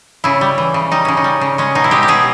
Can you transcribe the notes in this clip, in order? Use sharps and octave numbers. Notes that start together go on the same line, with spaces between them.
C#3 E4
G3
E3
C#3
G3 D#4
C#3 C#4
D#4
G3
C#3
G#3 C#4
B2 D#4
E4
G#3 G4
G4
B2 G#4